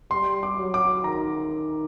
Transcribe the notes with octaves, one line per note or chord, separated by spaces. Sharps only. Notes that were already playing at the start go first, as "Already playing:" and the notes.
G3 C6
D6
F#3
D6
D#3 A#5